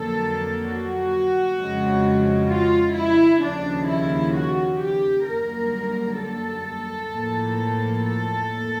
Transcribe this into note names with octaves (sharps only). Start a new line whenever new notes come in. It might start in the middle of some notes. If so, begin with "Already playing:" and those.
Already playing: F2 D3 F#3 A#3 A4
F#4
F2 C#3 F3 G#3
F4
E4
D#2 C#3 F3 D4
E4
F#4
G4
F#2 D3 G3 A#3 A#4
A4
A2 F3 A#3
A4